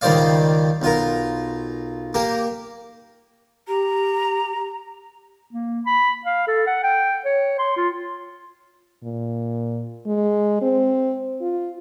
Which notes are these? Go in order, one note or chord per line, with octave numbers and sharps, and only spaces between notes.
C#2 D#3 G3 C5 D5 F5
B1 F4 A#4
A#3 G4 A#4
G4 A#5
A#3
B5
F5
A4
F#5
G5
C#5
C6
F4
A#2
G#3
C4
F4